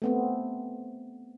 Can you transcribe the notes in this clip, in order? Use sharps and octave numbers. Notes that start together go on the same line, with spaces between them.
A3 B3 C4